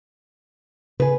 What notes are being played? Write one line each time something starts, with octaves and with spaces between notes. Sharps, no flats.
C#3 G#4 B4